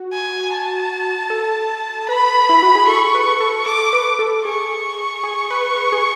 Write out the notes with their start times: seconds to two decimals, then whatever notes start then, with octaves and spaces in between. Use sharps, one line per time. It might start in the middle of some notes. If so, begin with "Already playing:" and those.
Already playing: F#4
0.13 G#5
0.52 A5
1.30 A4
2.09 B4 B5
2.49 E4
2.63 F#4
2.75 G#4
2.87 A4 C#6
3.15 B4
3.40 A4
3.66 A4 D6
3.93 B4
4.19 A4
4.45 G#4 C#6
5.24 G#4
5.50 B4
5.76 B4
5.92 G#4